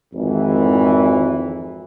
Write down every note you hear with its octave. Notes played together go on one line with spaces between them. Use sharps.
G#1 F2 E3